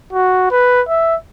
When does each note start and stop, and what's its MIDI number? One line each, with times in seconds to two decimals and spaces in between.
0.13 0.46 66
0.51 0.81 71
0.88 1.15 76